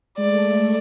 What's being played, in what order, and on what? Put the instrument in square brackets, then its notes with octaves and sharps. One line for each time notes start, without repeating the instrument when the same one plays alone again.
[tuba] G#3 [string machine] A3 [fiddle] D5